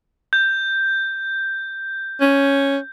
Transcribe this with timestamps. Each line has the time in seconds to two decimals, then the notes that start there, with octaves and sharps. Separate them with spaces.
0.33 G6
2.20 C#4